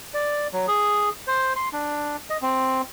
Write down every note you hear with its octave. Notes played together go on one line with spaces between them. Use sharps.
D5
F#3
G#4
C5
C6
D4
D#5
C4